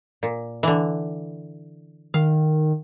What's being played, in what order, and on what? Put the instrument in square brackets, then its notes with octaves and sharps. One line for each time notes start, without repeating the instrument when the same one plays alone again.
[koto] A#2
D3 E3
[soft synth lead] D#3 [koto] F5